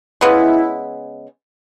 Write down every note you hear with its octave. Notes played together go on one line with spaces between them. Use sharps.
C#3 G#3 B3 E4